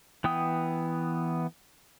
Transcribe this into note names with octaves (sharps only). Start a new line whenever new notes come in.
E3 B3 G5 D#6